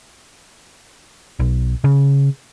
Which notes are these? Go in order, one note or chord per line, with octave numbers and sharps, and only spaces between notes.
B1
C#3